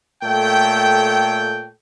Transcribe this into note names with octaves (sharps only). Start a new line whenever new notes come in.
A#2 A3 A4 C#5 G5